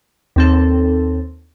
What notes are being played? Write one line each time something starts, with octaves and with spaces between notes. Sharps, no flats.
D#2 C4 A4